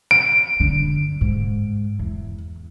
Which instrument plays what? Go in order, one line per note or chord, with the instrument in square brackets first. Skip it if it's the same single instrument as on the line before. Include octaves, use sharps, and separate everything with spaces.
[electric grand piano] D7
[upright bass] D3
G#2
E2